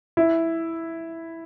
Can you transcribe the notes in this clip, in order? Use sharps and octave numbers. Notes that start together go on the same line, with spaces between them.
E4